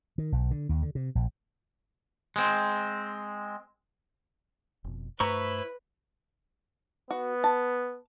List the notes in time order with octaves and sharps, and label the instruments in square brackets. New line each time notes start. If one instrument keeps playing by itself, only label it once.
[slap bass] D#3
B1
D3
D#2
D3
C3
A#1
[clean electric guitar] G#3 C4
[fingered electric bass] F1 B2
[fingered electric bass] G2 A3 [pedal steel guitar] E4 C5 C#6 [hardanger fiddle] B4 [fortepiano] A#5
[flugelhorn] B3 [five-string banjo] F#4
[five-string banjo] A5